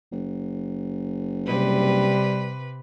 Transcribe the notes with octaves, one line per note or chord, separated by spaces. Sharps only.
F#1
C3 G3 B4